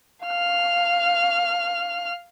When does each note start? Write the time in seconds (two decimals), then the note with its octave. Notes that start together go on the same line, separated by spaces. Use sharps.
0.25 F5 F6